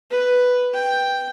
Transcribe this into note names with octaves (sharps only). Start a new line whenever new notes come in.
B4
G5